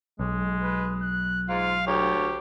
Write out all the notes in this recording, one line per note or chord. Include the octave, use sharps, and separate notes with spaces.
B1 G#3
B4
F#6
G#2 F4 F5
D2 G4 C#5